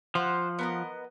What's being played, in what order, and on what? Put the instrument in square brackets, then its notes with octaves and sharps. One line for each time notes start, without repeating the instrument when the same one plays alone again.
[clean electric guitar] F3 [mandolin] F4 C5 F#5
[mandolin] B3 A#4 D#5